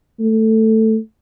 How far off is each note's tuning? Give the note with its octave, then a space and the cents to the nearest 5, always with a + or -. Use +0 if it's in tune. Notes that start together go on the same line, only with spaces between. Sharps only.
A3 +5